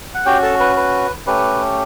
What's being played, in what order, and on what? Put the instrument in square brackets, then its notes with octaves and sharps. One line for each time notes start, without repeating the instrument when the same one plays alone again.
[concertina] F#5
C#4 F#4 G4 G5
A4 A5
B4
B4
A3 C#4 G4 B4